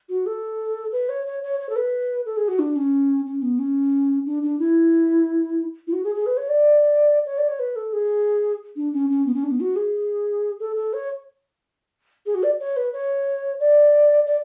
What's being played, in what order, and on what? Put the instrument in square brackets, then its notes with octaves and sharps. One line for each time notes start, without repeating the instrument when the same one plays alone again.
[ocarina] F#4
A4
B4
C#5
C#5
C#5
C#5
A4
B4
A4
G#4
F#4
D4
C#4
C#4
B3
C#4
D4
D4
E4
E4
F#4
G#4
G#4
B4
C#5
D5
C#5
D5
C#5
B4
A4
G#4
D4
C#4
C#4
B3
C#4
D4
B3
F#4
G#4
A4
A4
C#5
G#4
F#4
D5
C#5
B4
C#5
D5
D5